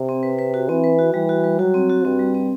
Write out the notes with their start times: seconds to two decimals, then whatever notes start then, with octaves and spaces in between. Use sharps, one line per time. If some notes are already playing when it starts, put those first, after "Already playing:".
Already playing: C3
0.09 C4
0.23 B4
0.39 B4
0.54 F#4
0.69 E3 C4
0.84 B4
0.99 F#4
1.14 E3 G3
1.29 F#4
1.44 G3
1.59 F#3 F#4
1.74 C4
1.89 F#4
2.05 G2 C4
2.19 G3
2.35 C4